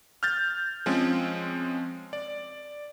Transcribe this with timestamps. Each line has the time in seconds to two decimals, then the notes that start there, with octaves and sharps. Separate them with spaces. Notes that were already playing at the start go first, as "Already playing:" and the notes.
0.23 F6 G6 A6
0.86 F3 G#3 C4 C#4
2.13 D5